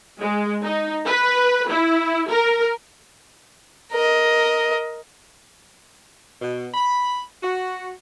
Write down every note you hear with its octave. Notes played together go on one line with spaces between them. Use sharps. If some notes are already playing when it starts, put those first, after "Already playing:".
G#3
D#4
B4
E4
A#4
A#4 D#5
B2
B5
F#4